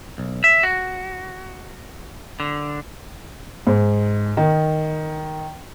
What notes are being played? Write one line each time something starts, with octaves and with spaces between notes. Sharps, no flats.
B1
E5
F#4
D3
G#2
D#3